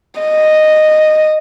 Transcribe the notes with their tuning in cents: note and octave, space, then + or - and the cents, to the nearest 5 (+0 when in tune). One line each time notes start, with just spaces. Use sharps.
D#5 -10